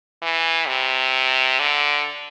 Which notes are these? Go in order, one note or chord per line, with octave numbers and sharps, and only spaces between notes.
E3
C3
D3